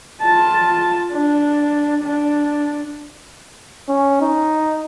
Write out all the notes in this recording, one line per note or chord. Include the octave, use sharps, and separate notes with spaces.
F4 A5
D4
D4
C#4
D#4